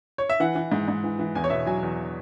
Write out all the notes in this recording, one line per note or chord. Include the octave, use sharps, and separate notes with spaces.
C#5
E5
E3 F#5
E3
G#2
G#2
E3
E3
E2 G#5
C#5
B2 E5
F#3 G#5
E2